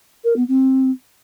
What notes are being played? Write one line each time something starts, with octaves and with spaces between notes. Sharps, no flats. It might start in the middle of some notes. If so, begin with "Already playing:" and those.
A#4
B3
C4